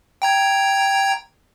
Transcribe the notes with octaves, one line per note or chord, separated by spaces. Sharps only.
G5 A#5 G#6